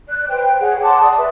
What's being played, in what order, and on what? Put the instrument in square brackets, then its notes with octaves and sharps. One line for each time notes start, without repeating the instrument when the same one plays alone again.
[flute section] D5 F#6
B4 C5 G5
G#4 C#5 F#5
F#5 A5 C6 D6
D5 D#6
B4 E5